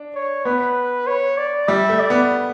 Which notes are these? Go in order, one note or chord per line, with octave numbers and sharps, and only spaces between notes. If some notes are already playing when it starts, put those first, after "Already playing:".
Already playing: D4
C#5
B3 B4
C#5
D5
G3 E5
A3
D5
B3